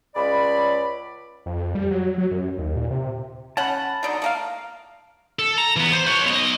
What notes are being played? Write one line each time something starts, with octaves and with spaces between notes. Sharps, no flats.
C#2 D5 B5
F2
G3
F#3
F#3
F#2
D#2
A#2
C3
C#4 F#5 A5 B5
B2 D3 D#4
A3 A#3 F5
A4
A#5
E3 B3
C5
B4 C#5
B1 D#5